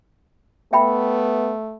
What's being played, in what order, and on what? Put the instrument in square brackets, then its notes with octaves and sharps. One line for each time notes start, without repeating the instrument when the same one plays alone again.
[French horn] A3 [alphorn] B3 [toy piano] E5 G5 B5